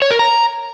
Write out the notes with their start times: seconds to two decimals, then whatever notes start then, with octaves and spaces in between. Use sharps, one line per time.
0.02 C#5
0.11 A#4
0.19 A#5